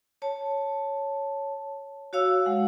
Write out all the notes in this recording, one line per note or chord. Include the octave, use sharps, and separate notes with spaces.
C#5 A5
F#4 C#5 F5 E6
G#3 F#5